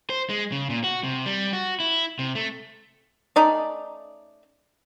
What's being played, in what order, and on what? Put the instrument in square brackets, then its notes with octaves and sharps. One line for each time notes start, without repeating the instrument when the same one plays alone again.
[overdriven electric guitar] C5
G#3
C#3
A#2
F#4
C3
G3
F#4
E4
C3
A3
[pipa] A3 C#4 D#4 D5